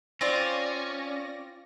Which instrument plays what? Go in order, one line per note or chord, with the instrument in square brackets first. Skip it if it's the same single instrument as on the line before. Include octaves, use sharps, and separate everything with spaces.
[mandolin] C4 F4 [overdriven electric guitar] C#4 [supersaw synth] D5 A#6